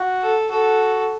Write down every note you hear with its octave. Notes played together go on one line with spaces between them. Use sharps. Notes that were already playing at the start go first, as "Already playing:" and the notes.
Already playing: F#4
A4
F#4 A4